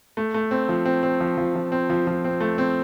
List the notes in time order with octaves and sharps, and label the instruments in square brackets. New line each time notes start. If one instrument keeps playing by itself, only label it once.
[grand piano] A3
A3
C4
F3
C4
C4
F3
F3
F3
C4
F3
F3
C4
A3
C4